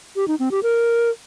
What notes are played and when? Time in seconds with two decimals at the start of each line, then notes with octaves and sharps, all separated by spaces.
0.16 G4
0.28 D#4
0.40 C4
0.51 G4
0.63 A#4